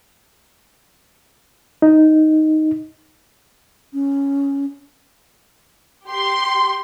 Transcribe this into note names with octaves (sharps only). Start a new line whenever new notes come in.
D#4
C#4
G4 C6